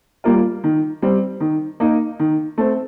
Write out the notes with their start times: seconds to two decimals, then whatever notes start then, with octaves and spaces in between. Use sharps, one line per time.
0.24 G3 A#3 F4
0.64 D#3
1.02 G3 C4
1.40 D#3
1.80 A#3 D#4
2.19 D#3
2.58 A3 C4